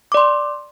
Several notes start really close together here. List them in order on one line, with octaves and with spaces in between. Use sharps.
D6 D5 C6